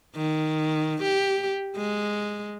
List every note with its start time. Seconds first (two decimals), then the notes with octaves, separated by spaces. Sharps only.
0.16 D#3
1.03 G4
1.76 G#3